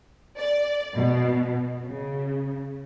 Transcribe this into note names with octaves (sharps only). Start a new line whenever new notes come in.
D5
B2
C#3